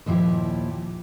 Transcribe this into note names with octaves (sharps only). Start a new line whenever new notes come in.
D#2 A#2 F3 E4 G4